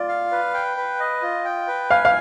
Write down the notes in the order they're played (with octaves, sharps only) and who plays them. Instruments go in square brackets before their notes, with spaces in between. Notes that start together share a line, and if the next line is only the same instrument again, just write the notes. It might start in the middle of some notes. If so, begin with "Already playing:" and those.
Already playing: [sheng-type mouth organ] F4 [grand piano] D5
[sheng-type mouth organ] F5
B4
G5
B4
D#5
F4
G5
B4
[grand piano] F5 [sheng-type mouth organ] G#5
[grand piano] F5